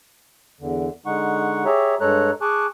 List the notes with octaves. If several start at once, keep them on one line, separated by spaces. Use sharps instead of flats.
E2 D3
D3 G#3 D#4 F#5 C#6
G4 G#4 C#5 E5 A#5
G2 G#3 A4 C#5 A#5 F#6
G#4 G#5 A5 C#6 D6 F#6